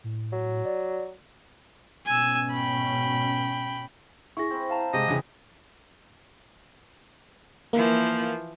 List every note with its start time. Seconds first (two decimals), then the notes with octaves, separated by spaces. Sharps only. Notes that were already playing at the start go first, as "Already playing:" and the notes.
0.04 A2
0.33 F#3
0.65 D5
2.07 G#2 B2 C#4 G#5 E6
2.52 G5 B5
4.37 E4 G#4 C#6 A#6
4.50 C4 B4
4.70 F5 A5 A#5
4.93 C3 G#3 G4 D#5
5.08 E2 C#3 E5 F#5 G#5
7.73 E3 F3 A#3